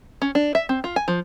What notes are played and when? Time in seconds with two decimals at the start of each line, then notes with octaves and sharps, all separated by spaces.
0.22 C#4
0.35 D4
0.55 E5
0.69 C4
0.84 F4
0.96 G#5
1.08 F3